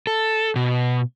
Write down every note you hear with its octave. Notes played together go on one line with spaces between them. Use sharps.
A4
B2